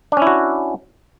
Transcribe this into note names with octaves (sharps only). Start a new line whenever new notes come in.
C#4 D4 E4 F#4